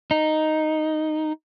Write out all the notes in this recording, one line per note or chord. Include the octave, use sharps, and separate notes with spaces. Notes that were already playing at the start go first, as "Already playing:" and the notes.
D#4